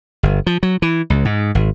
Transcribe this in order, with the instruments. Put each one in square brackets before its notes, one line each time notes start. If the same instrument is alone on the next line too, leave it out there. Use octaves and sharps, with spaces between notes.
[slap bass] G1
F3
F#3
E3
C#2
G#2
G#1